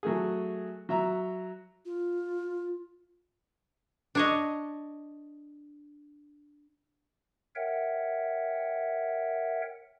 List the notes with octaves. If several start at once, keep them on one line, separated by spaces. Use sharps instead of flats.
F#3 A3 G#4
F#3 E5 A#5
F4
D4 C#5 D#5
A#4 C#5 E5 F#5 G5